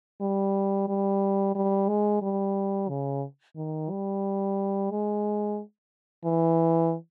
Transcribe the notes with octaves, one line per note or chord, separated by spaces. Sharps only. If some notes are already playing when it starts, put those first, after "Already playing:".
G3
G3
G3
G#3
G3
C#3
D#3
G3
G#3
E3